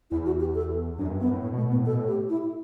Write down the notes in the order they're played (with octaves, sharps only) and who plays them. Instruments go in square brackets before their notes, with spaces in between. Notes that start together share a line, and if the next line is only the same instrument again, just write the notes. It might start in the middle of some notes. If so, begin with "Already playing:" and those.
[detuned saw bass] E2 [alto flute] E4
[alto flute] F#4
G4
A4
[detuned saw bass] F#2 [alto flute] D4
[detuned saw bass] G2
[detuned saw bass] F#2 [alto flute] B3
[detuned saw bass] A2
[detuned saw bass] A2 [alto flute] B3
[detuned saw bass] B2
[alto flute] A3
[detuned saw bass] B2
[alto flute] B3
[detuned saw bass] A2
[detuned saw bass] B2 [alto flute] A4
[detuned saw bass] A2
[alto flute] G4
E4